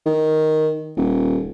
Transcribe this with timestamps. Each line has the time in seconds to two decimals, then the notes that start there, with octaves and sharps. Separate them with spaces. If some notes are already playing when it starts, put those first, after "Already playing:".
0.06 D#3
0.97 D#1